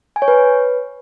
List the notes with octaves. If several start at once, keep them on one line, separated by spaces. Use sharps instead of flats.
G#5
C#5
B4